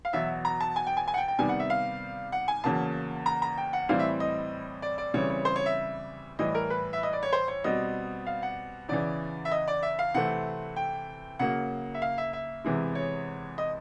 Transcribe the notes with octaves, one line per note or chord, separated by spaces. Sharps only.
F5
E2 B2 F#3 E5
A#5
A5
G#5
G5
G#5
G#5
F#5
G5
G5
C3 D#3 G3 B3 G#5
F#5
E5
F5
F#5
G#5
E2 C#3 F#3 A#3 A5
A#5
A#5
G5
F#5
A2 E3 G3 C4 F5
E5
D#5
D5
D5
C#3 E3 G3 C4 C#5
C#5
C5
C#5
E5
A2 E3 G3 D#5
A#4
B4
E5
D#5
D5
C#5
C5
C#5
B2 G3 C4 D#5
F5
F#5
E2 C#3 E3 D5
E5
D#5
D5
E5
F5
C3 E3 A3 C4 F#5
G5
C#3 F#3 A#3 F#5
E5
F5
E5
E5
E2 C3 E3 G#3
C#5
D#5